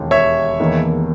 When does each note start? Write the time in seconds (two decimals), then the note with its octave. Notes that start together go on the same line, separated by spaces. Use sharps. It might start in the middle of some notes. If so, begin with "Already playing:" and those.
Already playing: E1 D#2 D#3
0.11 C#5 E5
0.60 E1 E2 D#3 A#3